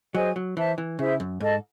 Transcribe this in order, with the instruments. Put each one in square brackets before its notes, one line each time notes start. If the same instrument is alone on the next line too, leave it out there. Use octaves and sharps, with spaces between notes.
[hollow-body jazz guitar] F#3 [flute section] G#4 C5 D#5 G#5
[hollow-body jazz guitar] F#3
[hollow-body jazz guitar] E3 [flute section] C5 E5 A5
[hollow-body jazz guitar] E3
[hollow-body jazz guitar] C#3 [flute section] E4 G#4 C5 E5
[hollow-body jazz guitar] F#2
[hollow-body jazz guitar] G#2 [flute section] A4 D#5 A5